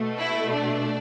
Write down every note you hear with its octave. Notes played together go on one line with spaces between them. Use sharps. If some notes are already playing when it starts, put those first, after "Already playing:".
Already playing: B2 A3
E4
D4